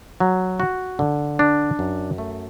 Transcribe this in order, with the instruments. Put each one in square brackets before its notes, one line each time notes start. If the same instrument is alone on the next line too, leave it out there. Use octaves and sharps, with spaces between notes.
[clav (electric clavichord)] F#3
F#4
D3
D4
F#2
A3